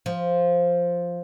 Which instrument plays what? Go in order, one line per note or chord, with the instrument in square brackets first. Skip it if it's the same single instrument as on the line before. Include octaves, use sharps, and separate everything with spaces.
[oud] F3